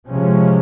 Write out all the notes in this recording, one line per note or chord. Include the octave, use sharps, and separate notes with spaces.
C3 F3 G#3 C#4